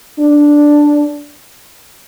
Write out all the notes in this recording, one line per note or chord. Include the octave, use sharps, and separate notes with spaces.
D4